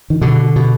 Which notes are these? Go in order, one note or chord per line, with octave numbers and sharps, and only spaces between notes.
D#3
B2 D3
B2